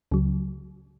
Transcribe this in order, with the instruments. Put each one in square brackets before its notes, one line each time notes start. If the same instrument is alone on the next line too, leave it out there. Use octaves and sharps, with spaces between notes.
[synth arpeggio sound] C#2 C#3 F#3